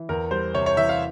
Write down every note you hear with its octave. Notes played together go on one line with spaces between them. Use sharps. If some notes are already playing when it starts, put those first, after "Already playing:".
Already playing: E3
E2 A#4
G3 C5
C3 C#5
C#5
E3 E5
F5